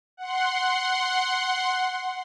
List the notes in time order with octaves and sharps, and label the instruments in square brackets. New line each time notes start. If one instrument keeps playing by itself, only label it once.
[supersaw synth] F#5 C6